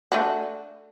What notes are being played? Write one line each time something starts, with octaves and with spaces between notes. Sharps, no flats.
A3 D4 F#4